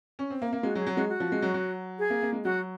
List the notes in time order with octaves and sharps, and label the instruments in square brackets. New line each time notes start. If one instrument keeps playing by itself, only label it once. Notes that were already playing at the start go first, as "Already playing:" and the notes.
[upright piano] C#4
C4
A#3
A#3
[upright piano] G#3 [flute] F#4
[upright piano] F#3
[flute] G#4
[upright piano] F#3
[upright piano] G#3 [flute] F#4
[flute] F#4
[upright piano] F3
G#3
F#3
F#3
[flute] G#4
[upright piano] A#3
A#3
G#3
[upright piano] F#3 [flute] F#4